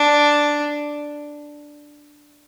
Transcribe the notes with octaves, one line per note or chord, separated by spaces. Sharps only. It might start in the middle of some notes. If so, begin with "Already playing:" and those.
Already playing: D4